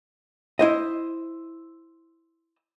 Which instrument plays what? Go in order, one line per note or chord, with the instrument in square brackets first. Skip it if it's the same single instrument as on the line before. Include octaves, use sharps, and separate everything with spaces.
[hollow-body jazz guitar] E4 C5 D#5